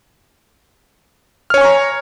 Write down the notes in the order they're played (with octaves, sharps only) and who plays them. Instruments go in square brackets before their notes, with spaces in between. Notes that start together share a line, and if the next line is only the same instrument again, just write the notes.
[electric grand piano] F6
C#5
G#5
C#6
A#5